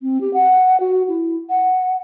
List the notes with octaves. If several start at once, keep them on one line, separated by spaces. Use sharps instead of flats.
C4
G4
F#5
F#4
E4
F#5